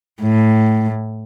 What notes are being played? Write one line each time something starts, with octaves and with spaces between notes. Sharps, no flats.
A2